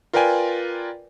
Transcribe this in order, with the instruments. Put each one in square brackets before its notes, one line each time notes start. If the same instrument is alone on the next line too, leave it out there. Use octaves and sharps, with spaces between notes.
[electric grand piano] F4 A#4 B4 D5 G5 G#5